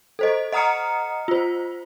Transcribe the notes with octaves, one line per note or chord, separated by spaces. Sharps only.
A4 C5 D#5
D#5 F#5 A#5 D#6 F6 C#7
F4 C5